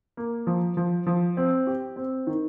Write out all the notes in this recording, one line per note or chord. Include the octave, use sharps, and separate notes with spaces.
A#3
F3
F3
F3
C4
G4
C4
D#3